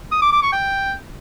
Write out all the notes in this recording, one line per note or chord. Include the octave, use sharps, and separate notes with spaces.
D#6
D6
D6
C#6
G5